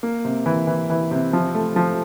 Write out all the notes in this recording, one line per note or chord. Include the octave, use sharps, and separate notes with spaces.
A#3
C3
E3
E3
E3
C3
F3
A3
F3